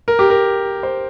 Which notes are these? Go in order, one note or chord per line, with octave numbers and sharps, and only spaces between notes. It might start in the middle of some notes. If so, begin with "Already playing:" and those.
A#4
G4
A#4
C5